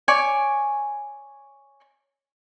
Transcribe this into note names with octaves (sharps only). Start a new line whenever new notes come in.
C#5 D5 G#5 C#6